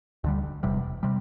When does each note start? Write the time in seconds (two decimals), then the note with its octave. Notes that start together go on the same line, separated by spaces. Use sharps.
0.24 D2 D3 G3
0.63 E1 E2 C3 G3
1.03 C3 G3